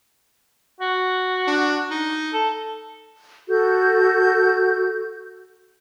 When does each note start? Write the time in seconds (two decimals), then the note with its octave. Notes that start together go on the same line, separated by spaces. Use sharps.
0.81 F#4
1.47 D4
1.90 D#4
2.33 A4
3.49 F#4 A4 G6